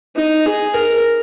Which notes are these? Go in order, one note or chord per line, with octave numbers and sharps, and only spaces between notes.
D#4
G#4
A#4